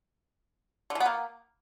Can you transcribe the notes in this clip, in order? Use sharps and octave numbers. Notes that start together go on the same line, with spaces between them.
D3
E3
B3
A#3